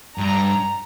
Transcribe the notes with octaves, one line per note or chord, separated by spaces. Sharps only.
G2 A#5